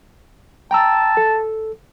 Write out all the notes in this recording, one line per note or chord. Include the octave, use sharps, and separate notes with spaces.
G5 A5 A#5 E6
A4